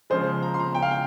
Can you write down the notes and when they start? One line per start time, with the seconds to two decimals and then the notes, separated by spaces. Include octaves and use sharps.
0.10 C#3 F3 G#3 C5
0.43 A#5
0.54 C6
0.59 A#5
0.75 G5
0.82 F5
0.91 G5